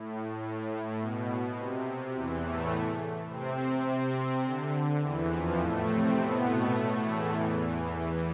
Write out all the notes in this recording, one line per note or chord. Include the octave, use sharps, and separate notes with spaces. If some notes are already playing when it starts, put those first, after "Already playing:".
Already playing: A2
A2
B2
C3
E2 E3
A2 A3
C3 C4
C3 C4
D3
E2 E3
F2 F3
A2 A3
C3 C4
B2 B3
A2 A3
A2 A3
E2 E3
E2 E3